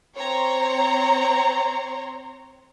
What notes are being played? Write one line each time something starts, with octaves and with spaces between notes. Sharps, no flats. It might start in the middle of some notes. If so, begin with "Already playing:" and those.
C4 C#5 A#5 C6